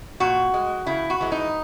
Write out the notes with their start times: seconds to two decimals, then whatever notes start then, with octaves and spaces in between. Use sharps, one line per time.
0.20 A#2 F#4
0.54 G#3
0.86 C#3 E4
1.10 F#4
1.21 E3 G#3
1.32 D#4